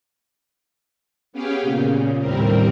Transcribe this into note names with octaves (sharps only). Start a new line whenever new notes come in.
B3 C#4 G4 G#4 F5 G5
A#2 C#3
D#2 A2 G3 C4 A#4